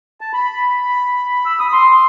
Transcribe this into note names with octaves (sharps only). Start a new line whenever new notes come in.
A5
B5
E6
D#6
C6